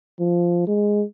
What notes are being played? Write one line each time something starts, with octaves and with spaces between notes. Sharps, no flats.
F3
G#3